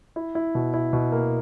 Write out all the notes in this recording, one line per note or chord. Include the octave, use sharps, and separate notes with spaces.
E4
E4
B2
E4
B2
A#3